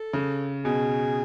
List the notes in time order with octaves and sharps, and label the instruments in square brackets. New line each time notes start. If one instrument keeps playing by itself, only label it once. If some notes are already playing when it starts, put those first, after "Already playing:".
Already playing: [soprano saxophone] A4
[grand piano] C#3
[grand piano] B2 [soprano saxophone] G#4